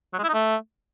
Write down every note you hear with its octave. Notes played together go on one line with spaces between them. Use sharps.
F#3
G#3
E4
D#4
A3